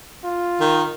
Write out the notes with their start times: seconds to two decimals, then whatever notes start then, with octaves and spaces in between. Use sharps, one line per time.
0.24 F4
0.61 D#3